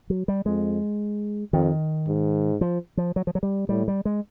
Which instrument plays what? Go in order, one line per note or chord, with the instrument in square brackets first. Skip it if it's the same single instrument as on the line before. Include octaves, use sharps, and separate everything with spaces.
[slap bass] F#3
G3
[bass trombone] F2 [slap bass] G#3
[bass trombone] F2 [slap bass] D#3
[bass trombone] G#2
[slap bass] F3
F3
F#3
F3
F#3
G3
[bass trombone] A2 [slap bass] G3
[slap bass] G3
G#3